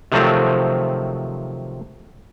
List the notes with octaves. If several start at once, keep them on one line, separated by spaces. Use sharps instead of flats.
C3 D#3 F3 F#3 A3 C4